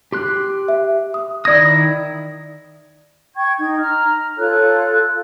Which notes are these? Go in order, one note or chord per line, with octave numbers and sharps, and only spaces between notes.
G4 C6 F#6
E5
D#6
D#3 E4 D5 D#6 G#6 A#6
G5 C#6 G#6
D#4
A#5 F6
F4 A4 C#5 F#6